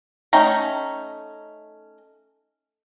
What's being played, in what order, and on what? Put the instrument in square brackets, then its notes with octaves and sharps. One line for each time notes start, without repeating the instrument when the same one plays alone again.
[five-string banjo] A3 C#4 D#4 G5 A#5